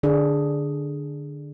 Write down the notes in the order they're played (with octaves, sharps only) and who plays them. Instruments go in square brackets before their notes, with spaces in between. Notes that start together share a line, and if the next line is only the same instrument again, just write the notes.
[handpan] D3 D4 G#4